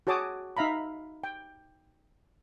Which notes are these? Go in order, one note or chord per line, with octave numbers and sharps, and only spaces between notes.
F#4 G#4 C#5 A5 D6 D#6
D#4 E5 F5 A#5 B5
G5